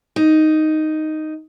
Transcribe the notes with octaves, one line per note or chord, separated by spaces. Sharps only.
D#4